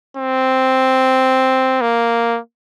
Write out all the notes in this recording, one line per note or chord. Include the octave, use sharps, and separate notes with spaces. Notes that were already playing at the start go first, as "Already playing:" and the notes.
C4
A#3